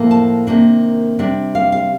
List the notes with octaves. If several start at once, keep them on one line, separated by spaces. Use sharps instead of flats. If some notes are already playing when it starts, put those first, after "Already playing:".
Already playing: A2 F3 A#3
A5
C3 D#3 A#3 D4
C3 G3 D4
F5
F5